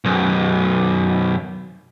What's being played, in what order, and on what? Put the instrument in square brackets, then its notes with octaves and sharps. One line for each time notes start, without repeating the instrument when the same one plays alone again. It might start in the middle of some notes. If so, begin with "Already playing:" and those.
[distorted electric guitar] B1 F#2